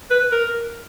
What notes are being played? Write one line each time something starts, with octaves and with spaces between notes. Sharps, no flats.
B4
A#4